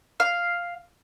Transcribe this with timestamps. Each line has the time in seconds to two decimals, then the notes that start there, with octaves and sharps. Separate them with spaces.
0.20 F5